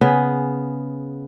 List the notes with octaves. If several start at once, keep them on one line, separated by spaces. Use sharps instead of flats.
C#3 B3 G#4